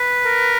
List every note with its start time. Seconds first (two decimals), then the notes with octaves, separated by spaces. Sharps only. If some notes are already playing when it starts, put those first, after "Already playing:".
Already playing: B4
0.25 A#4